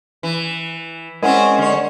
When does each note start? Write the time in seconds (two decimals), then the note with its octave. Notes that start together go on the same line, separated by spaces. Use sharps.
0.23 E3
1.23 G#3 C4 C#4 E4 A#4 F#5 G#5
1.58 D3 C#5